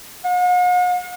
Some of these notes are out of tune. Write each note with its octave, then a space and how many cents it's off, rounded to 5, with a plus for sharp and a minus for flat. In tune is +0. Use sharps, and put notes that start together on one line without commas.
F#5 -45